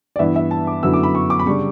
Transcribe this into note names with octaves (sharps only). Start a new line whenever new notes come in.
D5
G2 E3 B3 E4 E5
E5
A5
D6
F#2 D3 F#3 B3 E4 E6
D6
B5
C#6
D6
B5
C#3 G3 D4 C#6